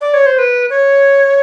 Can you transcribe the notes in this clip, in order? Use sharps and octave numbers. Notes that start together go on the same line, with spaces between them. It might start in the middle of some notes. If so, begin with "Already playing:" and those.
D5
C#5
C5
B4
C#5